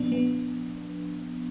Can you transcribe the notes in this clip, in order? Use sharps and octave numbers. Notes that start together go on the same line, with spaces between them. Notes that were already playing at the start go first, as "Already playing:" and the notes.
Already playing: A#2 F3 B3 D4
B3